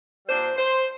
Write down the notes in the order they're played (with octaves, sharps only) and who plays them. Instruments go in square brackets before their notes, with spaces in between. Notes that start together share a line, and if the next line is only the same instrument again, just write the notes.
[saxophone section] A#2 G3 D4 C5
C5